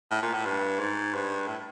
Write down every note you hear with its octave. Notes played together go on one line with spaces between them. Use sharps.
A2
A#2
A2
G2
G#2
G2
A2